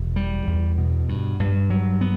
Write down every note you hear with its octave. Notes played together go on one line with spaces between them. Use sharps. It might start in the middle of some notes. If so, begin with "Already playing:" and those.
Already playing: E1
G3
E2
B2
G2
G2
F#3
B3